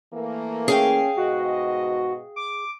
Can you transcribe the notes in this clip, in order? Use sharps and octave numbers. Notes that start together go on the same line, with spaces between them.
E3 A3 A#3
C#4 G#4 F5 G5
G#2 B2 F#4 D#5
D6